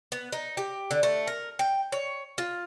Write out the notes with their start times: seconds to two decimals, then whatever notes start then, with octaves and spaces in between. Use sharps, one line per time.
0.12 B3
0.32 D#4
0.57 G4
0.91 D3
1.03 A3
1.27 A#4
1.59 G5
1.92 C#5
2.38 F4